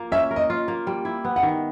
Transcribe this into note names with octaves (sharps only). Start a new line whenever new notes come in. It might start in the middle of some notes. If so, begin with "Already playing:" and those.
Already playing: A#3 F4
C#4 E5
A#4
D#5
F4
A#3
G3
E4
B3
F#5
D#3